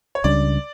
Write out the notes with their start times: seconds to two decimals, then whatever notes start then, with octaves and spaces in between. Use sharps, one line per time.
0.15 C#5
0.24 C#2 C#3 G3 D4 D5